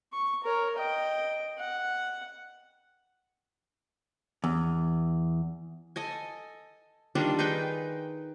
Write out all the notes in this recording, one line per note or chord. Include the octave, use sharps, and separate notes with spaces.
C#6
A#4 C#5
D#5 G5
F#5
E2
A4 D#5 G#5
D#3 G3 D4 F4
D#4 G#4 B4 G5